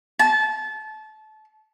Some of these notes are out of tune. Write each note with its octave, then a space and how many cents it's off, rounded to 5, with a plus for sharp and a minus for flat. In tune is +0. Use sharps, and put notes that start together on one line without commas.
A5 -25